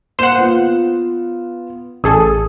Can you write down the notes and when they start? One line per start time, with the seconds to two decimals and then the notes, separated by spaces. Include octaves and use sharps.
0.19 A#3 C5 F#5 E7
0.38 B3 F4
2.04 A1 G#4 A4 D#6